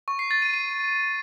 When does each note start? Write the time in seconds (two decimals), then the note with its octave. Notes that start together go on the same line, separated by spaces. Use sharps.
0.08 C#6
0.19 C7
0.31 A6
0.42 D#7
0.54 D#7